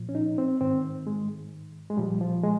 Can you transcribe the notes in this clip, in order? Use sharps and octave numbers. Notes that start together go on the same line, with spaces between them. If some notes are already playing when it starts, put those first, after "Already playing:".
Already playing: A#2 F3
C#4
D#4
C4
G#2 D#3 C4
G#3
G#3
A#2 F3 G3
F3
G#3